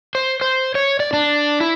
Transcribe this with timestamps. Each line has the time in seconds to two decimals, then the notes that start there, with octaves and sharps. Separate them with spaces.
0.15 C5
0.41 C5
0.75 C#5
1.00 D5
1.13 D4
1.61 E4